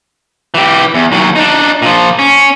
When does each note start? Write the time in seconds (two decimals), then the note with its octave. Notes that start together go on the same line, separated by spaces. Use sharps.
0.54 E3 G4
0.94 E2
1.12 D#2 F#3
1.36 D4 D#4
1.82 A#2 F3
2.19 C#4